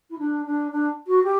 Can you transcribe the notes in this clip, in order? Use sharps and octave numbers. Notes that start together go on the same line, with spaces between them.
E4
D4
D4
D4
F#4
G4